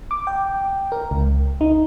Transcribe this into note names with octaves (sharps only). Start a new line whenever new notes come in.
D6
G5
A#4
C#2
D#4